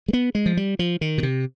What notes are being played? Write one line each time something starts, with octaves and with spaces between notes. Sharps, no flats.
G#3
B3
G#3
F3
G3
F3
D#3
B2
C3